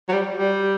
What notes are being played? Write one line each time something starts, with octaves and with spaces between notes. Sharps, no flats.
F#3
G3
G3